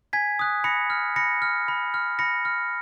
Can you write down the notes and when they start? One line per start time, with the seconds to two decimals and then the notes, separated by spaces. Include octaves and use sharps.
0.13 G#5 G#6 B6
0.39 D#6 F#6
0.64 B5 A#6 C#7
0.90 F6
1.16 B5 A#6 C#7
1.42 F6
1.68 B5
1.94 F6
2.19 B5 A#6 C#7
2.45 F6